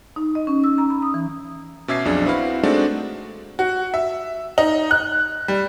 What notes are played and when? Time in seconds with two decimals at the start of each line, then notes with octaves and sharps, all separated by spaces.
0.16 D#4
0.35 D#5
0.47 C#4
0.64 E6
0.78 A#5
0.90 B5
1.02 D#6
1.14 E3
1.88 B2 C#4 E5 D6 G#6 C7
2.05 B1 F2 D4 G#4
2.25 C4 E4 F#4 B4 F5
2.63 G#3 A3 C4 D4 D#4 F#4
3.59 F#4
3.94 E5
4.58 D#4
4.91 F#6
5.48 G3